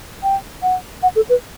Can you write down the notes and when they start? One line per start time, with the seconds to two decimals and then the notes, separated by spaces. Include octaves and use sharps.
0.23 G5
0.62 F#5
1.03 F#5
1.16 A4
1.29 B4